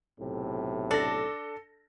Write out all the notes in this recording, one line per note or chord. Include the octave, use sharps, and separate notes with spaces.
B1 A2 C3
D4 A4 A#6